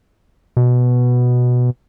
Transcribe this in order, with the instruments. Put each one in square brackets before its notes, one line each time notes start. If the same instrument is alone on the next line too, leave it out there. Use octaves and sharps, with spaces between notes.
[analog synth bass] B2